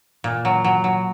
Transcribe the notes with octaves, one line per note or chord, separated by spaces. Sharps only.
A#2
F#3
F#3
F#3